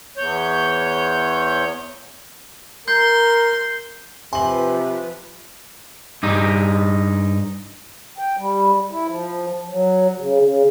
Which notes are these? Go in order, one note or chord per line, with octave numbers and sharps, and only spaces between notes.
E2 C#5 G6
A#4 C6 G6
C3 F3 B4 G#5 C6 F#7
G2 D#4
G5
G3
E4
F3
F#3
C#3
C#3